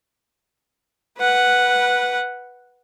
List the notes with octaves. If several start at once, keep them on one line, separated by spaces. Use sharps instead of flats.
B4 F#5